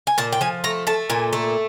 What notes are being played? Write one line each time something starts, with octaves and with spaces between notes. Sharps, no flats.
G#5
A#2 A5
G5
F3 G#5
A3 A#5
A3 A5
A#2 G#5
A3